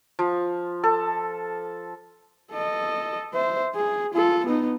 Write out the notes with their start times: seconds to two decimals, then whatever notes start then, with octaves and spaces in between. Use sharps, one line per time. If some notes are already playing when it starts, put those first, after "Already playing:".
0.19 F3
0.84 A4
2.52 A4 D#5
3.34 C5 E5
3.75 G#4
4.14 F4 A4
4.46 B3 D#4